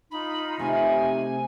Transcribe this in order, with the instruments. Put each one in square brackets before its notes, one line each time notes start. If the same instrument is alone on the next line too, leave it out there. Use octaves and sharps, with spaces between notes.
[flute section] D#4 F4 [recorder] B5
[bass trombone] C3 [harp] A3 [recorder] G#5